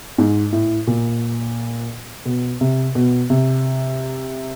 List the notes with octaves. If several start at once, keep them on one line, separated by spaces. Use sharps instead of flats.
G#2
A2
A#2
B2
C3
B2
C3